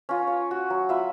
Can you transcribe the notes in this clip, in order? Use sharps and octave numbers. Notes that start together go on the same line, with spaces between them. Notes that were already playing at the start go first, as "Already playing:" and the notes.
C#4 F4
C#5
F#4
F#3
F4 E5 B5